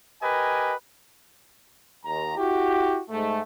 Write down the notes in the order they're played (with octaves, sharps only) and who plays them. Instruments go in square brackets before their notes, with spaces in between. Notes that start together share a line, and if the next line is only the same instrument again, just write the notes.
[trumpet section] G4 A#4 B4 D#5 G#5
[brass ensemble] D#2 A#5
E4 F#4 G4
G#2 A3